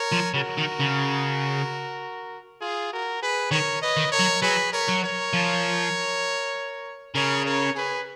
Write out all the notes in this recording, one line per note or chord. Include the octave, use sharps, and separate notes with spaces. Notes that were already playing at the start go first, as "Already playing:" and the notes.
Already playing: A#4 C#5
F3
C#3 F#4 A#4
D#3
C#3
F4 G#4
F#4 A#4
G#4 B4
D#3 A#4 C#5
B4 D#5
D#3
A#4 C#5
F#3
F#3 G#4 B4
A#4 C#5
F#3
A#4 C#5
F3
C#3 A#4 C#5
A#4 C#5
G#4 B4